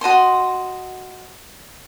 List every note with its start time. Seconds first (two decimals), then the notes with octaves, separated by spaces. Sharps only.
0.01 F#4 D#5 A5 C6